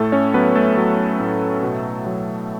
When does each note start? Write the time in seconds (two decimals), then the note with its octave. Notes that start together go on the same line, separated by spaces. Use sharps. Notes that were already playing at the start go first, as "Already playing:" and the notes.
Already playing: A2 A3 A4
0.12 C#4 C#5
0.34 F#3 B3 B4
0.55 A3 A4
0.77 F#3
1.20 A2
1.63 B2
2.06 F#3